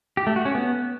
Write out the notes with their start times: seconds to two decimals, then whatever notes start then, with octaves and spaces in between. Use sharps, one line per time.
0.17 G4
0.27 A3
0.36 F#4
0.45 C#4
0.55 B3